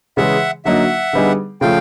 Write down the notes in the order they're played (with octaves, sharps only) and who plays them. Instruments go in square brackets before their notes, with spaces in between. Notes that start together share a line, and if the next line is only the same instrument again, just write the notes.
[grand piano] C#3 E3 G#3 [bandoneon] E5 F#5
[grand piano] D3 F#3 A#3 D#4 [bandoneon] E5 F#5
[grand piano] D3 G3 B3 D#4 G#4
[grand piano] C#3 F3 A3 [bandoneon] F5 G5